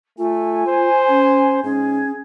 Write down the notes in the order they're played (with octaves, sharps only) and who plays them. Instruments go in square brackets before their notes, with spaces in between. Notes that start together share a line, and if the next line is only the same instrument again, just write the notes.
[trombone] A3 [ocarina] F4 [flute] G#5
[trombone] C5
[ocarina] C#4
[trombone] G#2 [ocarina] C#4 [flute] G#4